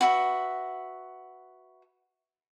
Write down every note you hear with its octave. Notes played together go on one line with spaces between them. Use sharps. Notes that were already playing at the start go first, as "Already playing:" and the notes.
F#4 B4 E5